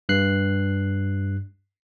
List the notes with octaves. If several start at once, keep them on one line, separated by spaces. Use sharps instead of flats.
G2 F#6 C7